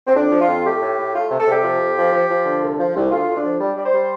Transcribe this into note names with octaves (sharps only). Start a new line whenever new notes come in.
C4
F2 D4
F3
F4
F2
A3 G4
A2
A2
A3 F4
C3
A4
C3 G4
F3
F2
F3
F3
F3
D3
C2
F3
C2
D2 F4
D2
D4
F3
G3 D4
G3 D5
C5
G3